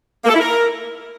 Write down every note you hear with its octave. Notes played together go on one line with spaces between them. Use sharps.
A#3
A4
E4
A#4